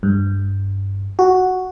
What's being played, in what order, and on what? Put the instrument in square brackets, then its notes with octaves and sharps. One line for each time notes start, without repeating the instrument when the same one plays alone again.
[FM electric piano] G2
F#4